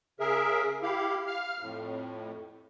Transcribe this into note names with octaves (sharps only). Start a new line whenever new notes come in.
C#3 G#4 A#4 E5
E4 G4 F5
F5 F6
F2 A2